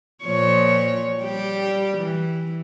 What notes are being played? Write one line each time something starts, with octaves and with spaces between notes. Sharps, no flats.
A#2 F3 C#5
G3 G4
E3